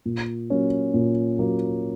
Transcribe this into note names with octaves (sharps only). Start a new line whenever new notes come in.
A#2
F#3 A#3 C#4
A#2
F#3 A#3 C#4